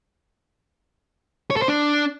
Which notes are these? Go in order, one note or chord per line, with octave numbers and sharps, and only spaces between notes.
C#5
A4
C5
D4